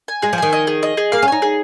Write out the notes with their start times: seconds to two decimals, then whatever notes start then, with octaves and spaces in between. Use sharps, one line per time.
0.08 G#5
0.22 G#3 G#4
0.33 F3
0.38 D#3 G#5
0.53 D#5
0.67 G#4
0.83 D#5
0.97 G#4
1.12 A#3 F5
1.22 C#4
1.28 D#4 G#5
1.42 G#4